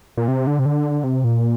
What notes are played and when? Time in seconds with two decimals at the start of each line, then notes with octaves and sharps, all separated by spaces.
0.17 A#2
0.28 C3
0.47 D3
0.59 C3
0.66 D3
1.04 C3
1.24 A#2